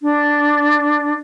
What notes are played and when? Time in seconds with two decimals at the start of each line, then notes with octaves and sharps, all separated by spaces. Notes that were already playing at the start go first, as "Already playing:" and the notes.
0.02 D4